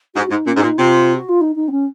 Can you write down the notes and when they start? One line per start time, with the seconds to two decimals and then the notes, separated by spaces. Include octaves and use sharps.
0.15 G#2 F#4
0.30 G#2 D#4
0.45 A#2 C#4
0.56 G#2
0.62 A#2 D#4
0.77 C3 F4
1.15 F#4
1.28 F4
1.41 D#4
1.55 D#4
1.68 C4
1.71 C#4